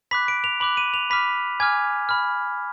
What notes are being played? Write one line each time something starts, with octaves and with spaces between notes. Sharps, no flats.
B5 D6 F#6 B6
D7
F7
B5 D6 F#6 F#7
D#7
F7
B5 D6 F6 B6
G#5 D6 F6 G#6
B5 F6